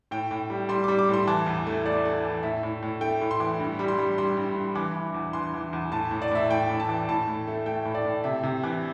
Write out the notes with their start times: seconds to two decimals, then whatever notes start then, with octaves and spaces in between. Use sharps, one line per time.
0.11 A2 G5
0.31 A2
0.50 G3
0.69 G3 C6
0.84 G3 D6
0.99 D6
1.09 A2 C6
1.27 E3 A5
1.46 E2
1.67 A3
1.85 A3 D5
2.05 A3
2.24 E3
2.43 A2 E5
2.63 A2
2.82 A2
3.01 A3 G5
3.21 A2
3.31 C6
3.40 E3
3.60 G2
3.79 G3
3.88 C6
3.98 G3
4.18 G3 C6
4.37 G2
4.56 G2
4.75 E3 D6
4.95 E3
5.14 E2
5.33 E3 C6
5.54 E3
5.73 E2
5.91 A2 A5
6.11 A2
6.22 D5
6.31 A2 E5
6.49 A2 G5
6.69 A2
6.80 A5
6.88 E3
7.09 A2 A5
7.27 A2
7.47 A3
7.66 A3 G5
7.85 A2
7.95 D5
8.05 A2
8.24 C3 E5
8.43 C3
8.63 E3